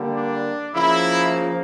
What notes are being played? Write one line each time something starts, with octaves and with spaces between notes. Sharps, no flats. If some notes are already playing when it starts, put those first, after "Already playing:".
Already playing: D3 G3 A#3
D4
C#3 F3 A#3 E4